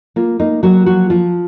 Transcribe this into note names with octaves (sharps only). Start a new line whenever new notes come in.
A#3 F4
A#3 D#4
F#3 A#3 F#4
F3 F#3 F#4
F3 F4